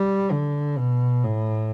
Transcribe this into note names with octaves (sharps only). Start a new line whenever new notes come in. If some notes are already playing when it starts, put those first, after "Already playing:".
Already playing: G3
D3
B2
A2